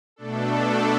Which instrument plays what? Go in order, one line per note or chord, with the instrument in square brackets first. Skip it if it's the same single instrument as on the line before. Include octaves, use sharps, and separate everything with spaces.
[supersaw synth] B2 A3 D4 A4